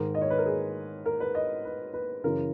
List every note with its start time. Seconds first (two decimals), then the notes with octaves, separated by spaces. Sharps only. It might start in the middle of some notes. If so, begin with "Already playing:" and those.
Already playing: G#2 D#3 A#4
0.14 D#5
0.21 C#5
0.30 B4
0.38 A#4
0.46 G#4
1.06 A#4
1.20 B4
1.35 D#5
1.65 B4
1.94 B4
2.24 F#2 C#3 E3 A#4